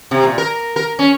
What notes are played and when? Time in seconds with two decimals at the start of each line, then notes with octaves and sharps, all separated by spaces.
0.11 C3
0.24 A#2
0.38 A#4
0.76 A#4
0.99 C#4